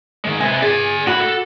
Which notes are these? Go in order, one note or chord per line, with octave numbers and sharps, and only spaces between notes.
D#3 G#3
C3 B3 G#5
G#4 D5 G#5
A2 F#4 B5 D6
A4